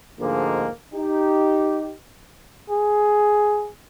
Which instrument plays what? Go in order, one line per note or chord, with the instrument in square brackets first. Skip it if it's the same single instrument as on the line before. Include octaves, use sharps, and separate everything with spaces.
[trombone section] D2 G#2 D3 F3 G#3 A#3
D#4 G4
[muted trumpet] G#4